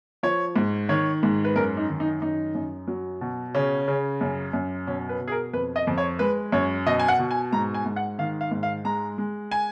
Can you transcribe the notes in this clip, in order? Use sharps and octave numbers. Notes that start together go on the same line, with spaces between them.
F3 C#5
G#2
D#3 C#5
G#2
B4
F#2 A#4
D#4
D#3
D#4
F#2 D#4
F#2
F#3
B2
C#3 C#4
C#3
F#2
F#2
B2 C#4
B4
B2
G#4
A#4
F2 B4
D#5
F2
C#5
G#3 B4
F#2 C#5
B2 D#5
G#5
F#5
B2
G#5
G#2 A#5
G#5
G#2
F#5
D#3 F5
F5
G#2
F5
G#3 A#5
G#3
G#5